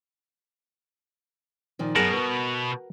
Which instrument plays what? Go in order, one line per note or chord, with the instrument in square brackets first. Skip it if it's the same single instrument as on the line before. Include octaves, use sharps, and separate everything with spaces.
[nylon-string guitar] A#2 D#3 F3
[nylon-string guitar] F#2 G#4 [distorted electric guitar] B2 [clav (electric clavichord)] A#4 F#5 A5
[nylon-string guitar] F#4 B4